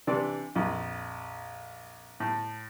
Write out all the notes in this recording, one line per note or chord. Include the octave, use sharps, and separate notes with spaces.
C3 E3 D4 D5
A#1 F2
A2